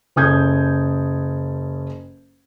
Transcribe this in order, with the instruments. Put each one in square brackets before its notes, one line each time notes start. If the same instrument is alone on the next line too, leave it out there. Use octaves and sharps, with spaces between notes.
[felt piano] F#1 C#4 A4 D#6 G6 G#6